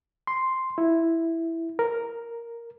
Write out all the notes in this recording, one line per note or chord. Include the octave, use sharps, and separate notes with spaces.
C6
E4
A#4